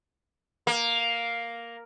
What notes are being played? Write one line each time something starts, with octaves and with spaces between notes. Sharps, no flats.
A#3